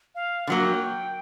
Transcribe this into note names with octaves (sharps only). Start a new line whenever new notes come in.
F5
D3 F#3 A#3 F#5
G5